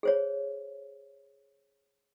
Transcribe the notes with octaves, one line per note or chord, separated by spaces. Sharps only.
G#4 C5 C#5